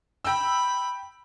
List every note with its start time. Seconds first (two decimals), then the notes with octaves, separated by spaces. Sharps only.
0.25 G5 B5 E6